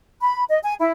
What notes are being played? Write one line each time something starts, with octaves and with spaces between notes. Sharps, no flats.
B5
D#5
G#5
E4